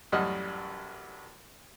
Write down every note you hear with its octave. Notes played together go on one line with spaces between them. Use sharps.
A1 F#2 G3 F#4 D#5 F6